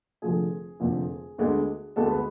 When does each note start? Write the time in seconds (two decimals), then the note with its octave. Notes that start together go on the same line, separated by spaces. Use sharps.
0.22 F1 F2 D3 F3 A3 G#4 G#5
0.80 F1 F2 D3 F3 A3
1.38 D2 D3 G#3 B3
1.96 D2 D3 G#3 B3 A4 A5
2.11 B4 B5